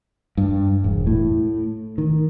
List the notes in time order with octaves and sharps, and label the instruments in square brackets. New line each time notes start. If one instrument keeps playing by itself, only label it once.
[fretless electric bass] G2
E1
A2
D#3